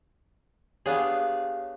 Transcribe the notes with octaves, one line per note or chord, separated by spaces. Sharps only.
B3 D4 G4 G#4 C#5 F5